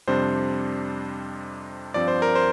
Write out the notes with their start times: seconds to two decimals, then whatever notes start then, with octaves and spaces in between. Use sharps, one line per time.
0.07 F2 C3 G3 D4 C5
1.94 G2 F3 C4 D5
2.08 C5
2.22 A#4
2.35 C5